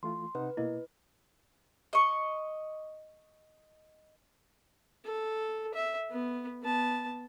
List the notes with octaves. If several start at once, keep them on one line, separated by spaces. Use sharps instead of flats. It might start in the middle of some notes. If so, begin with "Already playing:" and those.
E3 A3 F4 C6
C3 D#4 B4 F#5
B2 A#3 E4 D#5
D#5 C#6
A4
E5
B3
B3 A5